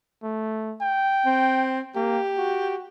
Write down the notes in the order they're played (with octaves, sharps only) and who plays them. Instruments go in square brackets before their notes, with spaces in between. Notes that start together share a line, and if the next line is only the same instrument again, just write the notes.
[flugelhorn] A3
G5
[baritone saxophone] C4
[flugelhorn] A#3 [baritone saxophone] G4
[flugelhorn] F#4